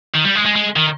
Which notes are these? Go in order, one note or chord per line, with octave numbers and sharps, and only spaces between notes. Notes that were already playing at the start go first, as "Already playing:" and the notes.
D#3
G3
G#3
G#3
G#3
D#3